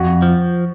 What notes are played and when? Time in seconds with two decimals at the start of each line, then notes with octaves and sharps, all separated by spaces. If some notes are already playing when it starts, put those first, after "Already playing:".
Already playing: F2 F#4
0.22 F3